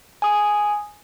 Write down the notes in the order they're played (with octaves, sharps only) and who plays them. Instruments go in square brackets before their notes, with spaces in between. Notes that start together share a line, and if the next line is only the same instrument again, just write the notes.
[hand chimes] G#5 D#6